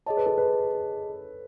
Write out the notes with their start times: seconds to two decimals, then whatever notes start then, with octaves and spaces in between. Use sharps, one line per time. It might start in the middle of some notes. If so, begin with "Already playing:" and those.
0.06 G#4 C#5 D#5 A5
0.17 B4
0.26 A4
0.38 B4